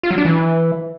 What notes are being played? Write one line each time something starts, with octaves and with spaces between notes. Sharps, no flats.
F4
F#3
D4
E3